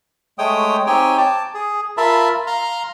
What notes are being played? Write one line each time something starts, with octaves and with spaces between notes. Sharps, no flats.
G#3 A3 C#5 G5 D#6
C4 D#4 G4 C#5 G5 G#5
A5 D6
G#4
F4 A#4 E5 F5 A5 B5
F5 A#5 C6